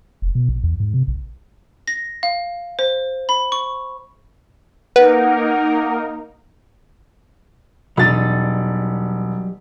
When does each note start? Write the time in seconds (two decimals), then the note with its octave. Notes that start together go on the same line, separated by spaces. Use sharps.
0.22 F1
0.35 B2
0.49 A#1
0.64 E2
0.80 G#2
0.94 C3
1.08 A#1
1.88 A#6
2.23 F5
2.79 C5
3.29 B5
3.52 C#6
4.96 A#3 D#4 A#4 B4 F#5
7.97 E1 F#3 G3 D#4 A6